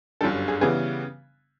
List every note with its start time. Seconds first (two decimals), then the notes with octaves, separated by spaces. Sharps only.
0.21 G1 F#2 D3 G3 G4 A4
0.48 G#4
0.61 C#3 E3 G3 B3 G#4